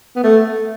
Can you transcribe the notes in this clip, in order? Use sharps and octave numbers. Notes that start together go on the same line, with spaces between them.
B3
A3